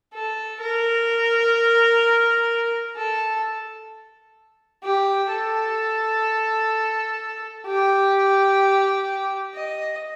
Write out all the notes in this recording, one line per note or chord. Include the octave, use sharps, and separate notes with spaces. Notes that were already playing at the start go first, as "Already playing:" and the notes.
A4
A#4
A4
G4
A4
G4
D#5